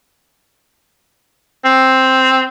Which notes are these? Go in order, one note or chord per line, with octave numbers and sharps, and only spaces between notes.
C4